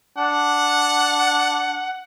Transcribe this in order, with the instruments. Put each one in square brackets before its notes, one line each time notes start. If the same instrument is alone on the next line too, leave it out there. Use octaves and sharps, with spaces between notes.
[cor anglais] D4 [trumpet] F#5